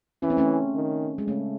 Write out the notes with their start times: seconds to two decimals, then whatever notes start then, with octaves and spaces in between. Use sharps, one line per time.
0.22 E3 C#4
0.30 C4
0.37 A3 C#4
0.75 D#3
1.18 G#3
1.27 C#3 A3